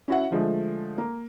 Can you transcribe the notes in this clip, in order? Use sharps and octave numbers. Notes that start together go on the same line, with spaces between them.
C#4 E4 F#4 E5 F#5
D3 F3 G#3 A3
A#3